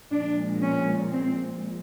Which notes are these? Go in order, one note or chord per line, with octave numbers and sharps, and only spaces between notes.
A#2 F3 G#3 D4
C#4
C4